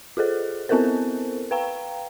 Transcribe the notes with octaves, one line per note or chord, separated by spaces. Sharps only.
F4 G#4 A4 C5
B3 C4 E4 A4 A#4 C5
B4 F5 G5 A#5